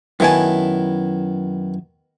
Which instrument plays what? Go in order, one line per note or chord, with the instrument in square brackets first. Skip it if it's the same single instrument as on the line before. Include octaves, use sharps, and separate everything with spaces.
[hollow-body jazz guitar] F#2 E4 G#5 [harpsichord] D#3 B3 A5